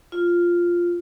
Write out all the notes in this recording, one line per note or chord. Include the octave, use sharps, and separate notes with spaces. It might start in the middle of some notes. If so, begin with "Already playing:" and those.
F4